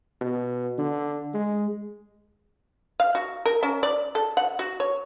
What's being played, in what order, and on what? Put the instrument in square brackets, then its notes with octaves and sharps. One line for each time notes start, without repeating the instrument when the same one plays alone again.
[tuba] B2
D3
G#3
[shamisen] F5
F#4
A#4
C#4
D5
A4
F#5
F#4
C#5